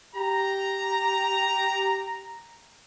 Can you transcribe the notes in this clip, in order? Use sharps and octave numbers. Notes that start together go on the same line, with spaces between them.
G4 A#5